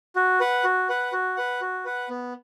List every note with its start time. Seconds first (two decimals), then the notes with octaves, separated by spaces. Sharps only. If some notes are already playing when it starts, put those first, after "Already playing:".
0.16 F#4
0.40 B4 F#5
0.64 F#4
0.89 B4 F#5
1.12 F#4
1.37 B4 F#5
1.61 F#4
1.85 B4 F#5
2.09 B3